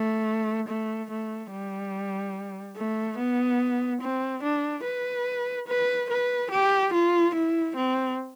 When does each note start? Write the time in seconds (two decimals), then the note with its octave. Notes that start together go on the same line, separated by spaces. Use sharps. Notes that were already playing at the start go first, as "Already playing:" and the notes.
Already playing: A3
0.68 A3
1.10 A3
1.52 G3
2.76 A3
3.18 B3
4.01 C4
4.42 D4
4.85 B4
5.68 B4
6.10 B4
6.51 G4
6.93 F4
7.34 E4
7.75 C4